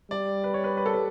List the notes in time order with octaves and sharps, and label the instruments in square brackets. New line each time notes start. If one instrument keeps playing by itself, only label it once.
[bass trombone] G3 [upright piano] D5
[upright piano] B4
C#5
B4
B4
A4
B4